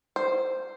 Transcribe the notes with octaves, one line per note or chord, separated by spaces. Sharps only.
C5